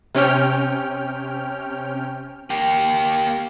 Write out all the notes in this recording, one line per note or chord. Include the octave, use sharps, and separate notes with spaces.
C3 C#4 G5 F6
A#3 G4